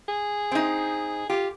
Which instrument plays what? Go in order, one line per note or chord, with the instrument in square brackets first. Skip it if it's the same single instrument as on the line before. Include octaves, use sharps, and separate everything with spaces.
[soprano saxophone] G#4
[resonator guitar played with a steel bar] C4 D#4
[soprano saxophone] F4 [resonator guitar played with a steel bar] G4